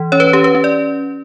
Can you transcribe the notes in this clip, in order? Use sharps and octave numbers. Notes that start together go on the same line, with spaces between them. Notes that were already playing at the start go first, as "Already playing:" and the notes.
Already playing: E3
C#4 C#5
B4
C#4 G4
B4
C#4
D5